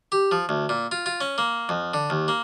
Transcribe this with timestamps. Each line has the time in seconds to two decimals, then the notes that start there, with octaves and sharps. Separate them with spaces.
0.12 G4
0.31 F3
0.49 D2
0.69 A#2
0.92 F4
1.06 F4
1.21 C#4
1.38 A#3
1.69 F2
1.94 D3
2.10 D#2
2.28 A#3